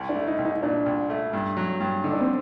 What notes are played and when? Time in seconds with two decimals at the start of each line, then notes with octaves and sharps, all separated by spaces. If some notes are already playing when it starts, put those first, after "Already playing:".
Already playing: C2
0.09 D4
0.15 A3
0.27 D#4
0.38 C2
0.45 D#4
0.63 A#2 D4
0.86 C2
1.10 A3
1.33 G2
1.57 F#3
1.80 G2
2.04 D3 D#4
2.12 D4
2.21 C4